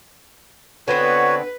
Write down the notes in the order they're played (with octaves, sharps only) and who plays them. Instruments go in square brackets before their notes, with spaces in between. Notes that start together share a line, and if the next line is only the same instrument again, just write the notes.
[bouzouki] D3 B3 C4 [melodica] F#4 C#5 [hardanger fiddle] B4